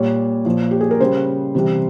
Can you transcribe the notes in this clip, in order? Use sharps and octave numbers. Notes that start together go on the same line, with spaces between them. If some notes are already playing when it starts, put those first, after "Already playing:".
Already playing: A#2 G3 C#5
A#2 F3
G4
G#4
A#4
C#3 G3 C5
C3 E3 G3